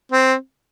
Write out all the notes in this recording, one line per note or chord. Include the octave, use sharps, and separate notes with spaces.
C4